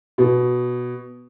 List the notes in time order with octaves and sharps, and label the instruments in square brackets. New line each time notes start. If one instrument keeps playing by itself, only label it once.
[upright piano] B2